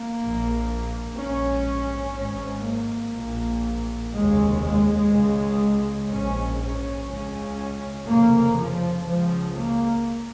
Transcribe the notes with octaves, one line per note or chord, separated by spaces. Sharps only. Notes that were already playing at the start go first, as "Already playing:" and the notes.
Already playing: A#3
A#1 A#2
A#1 G#2 C#4
G#1 G#2 C#4
A#3
A#1 A#2
F1 D#2 C#3 G#3
G#3
C#2 C#3
A#1 G#2 C#4
C#4
C#2 C#3
F1 F2 C#3 A#3
F3
C#2 C#3 F3
A#3